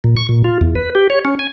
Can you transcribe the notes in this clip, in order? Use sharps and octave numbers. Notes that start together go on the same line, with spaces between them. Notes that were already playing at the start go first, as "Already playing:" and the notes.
A#2
C#6
A#2
F4
E2
B4
G4
C#5
C#4
G#5